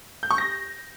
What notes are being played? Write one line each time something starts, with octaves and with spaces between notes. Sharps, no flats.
G6
C#6
A#6